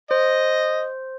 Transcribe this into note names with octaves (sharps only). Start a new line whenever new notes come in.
C5 D#5